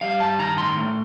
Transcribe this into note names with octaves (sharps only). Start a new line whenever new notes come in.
G3 F5
G2 A5
D#3 A#5
A2 C6
A3